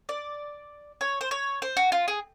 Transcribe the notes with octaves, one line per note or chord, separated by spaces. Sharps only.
D5
C#5
C5
C#5
C5
F#4
F4
G#4